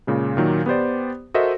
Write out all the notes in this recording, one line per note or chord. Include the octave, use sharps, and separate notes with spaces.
A#2 C#3 G#3
A#2 D#3 F#3
B3 G4 C5 D5
F#4 A4 A#4 C5 D#5 E5